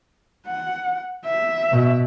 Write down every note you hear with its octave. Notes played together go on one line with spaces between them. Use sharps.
F#5
E5
B2